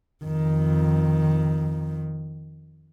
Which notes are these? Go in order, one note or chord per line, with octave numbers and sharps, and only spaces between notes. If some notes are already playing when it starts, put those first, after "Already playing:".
F2 D#3